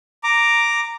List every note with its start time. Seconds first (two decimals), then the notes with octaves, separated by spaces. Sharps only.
0.23 A#5 D6